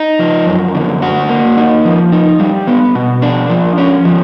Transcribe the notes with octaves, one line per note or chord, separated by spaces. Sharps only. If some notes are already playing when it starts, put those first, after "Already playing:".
Already playing: D#4
F3
F#2
D3
F#4
A#3
D#4
F3
D#4
G3
B3
B2
D4
F3
C#4
F3